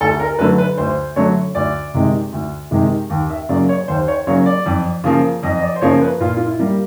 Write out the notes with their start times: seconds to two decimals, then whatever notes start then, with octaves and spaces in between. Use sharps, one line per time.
0.01 D2 A4
0.20 A#4
0.39 D3 F#3 A3 B4
0.58 B4
0.77 D2 C5
1.16 D3 F#3 A3 C#5
1.55 D2 D5
1.94 C3 D#3 G#3
2.33 D2
2.71 C3 D#3 G#3
3.10 D#2
3.30 E5
3.49 C#3 F#3 A#3 D5
3.69 C#5
3.88 D#2 C5
4.08 C#5
4.27 C#3 F#3 A#3 C#5
4.46 D5
4.66 F2
5.04 C#3 F3 A#3
5.43 F2 D#5
5.57 D#5
5.62 D5
5.76 C5
5.81 C#3 F3 A#3 C#5
6.02 B4
6.20 A#2 F4
6.37 F4
6.46 E4
6.59 G3 A#3